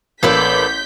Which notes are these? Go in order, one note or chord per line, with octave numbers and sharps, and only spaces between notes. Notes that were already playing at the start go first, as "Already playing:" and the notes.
A1 A#3 A4 B4 D5 G6 B6